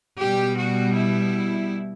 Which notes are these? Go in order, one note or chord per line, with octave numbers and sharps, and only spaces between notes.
B2 G3 G4
F#4
E4